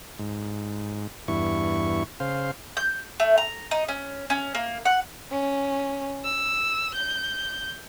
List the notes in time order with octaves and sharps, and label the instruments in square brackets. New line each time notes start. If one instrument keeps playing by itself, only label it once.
[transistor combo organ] G#2
E2 G2 E4 C#6
C#3 C5 F5
[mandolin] G6
A3
A#5
D#4
C#4
C#4
A#3
F#5
[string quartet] C#4
E6
G6